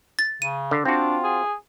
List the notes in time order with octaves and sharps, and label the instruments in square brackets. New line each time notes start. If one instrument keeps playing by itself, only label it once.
[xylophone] A6
[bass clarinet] C#3 [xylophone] D#7
[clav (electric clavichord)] D3
[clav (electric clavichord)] C4 F#4 [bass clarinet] D4 [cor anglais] F4
[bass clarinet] G#4